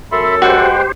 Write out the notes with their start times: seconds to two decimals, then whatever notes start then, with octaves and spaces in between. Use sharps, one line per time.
0.12 F#2 A4 E5 B5 C6
0.42 G#3 F#4 G4 B4 C5 G5